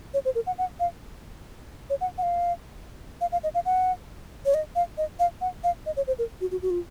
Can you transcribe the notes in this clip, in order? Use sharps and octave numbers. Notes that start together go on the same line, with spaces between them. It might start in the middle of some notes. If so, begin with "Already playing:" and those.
C#5
C5
A#4
F#5
F#5
F5
C#5
F#5
F#5
F5
F5
F5
D#5
F5
F#5
C#5
D#5
F5
D#5
F5
F#5
F5
D#5
C#5
C5
A#4
F#4
F#4
F#4
F4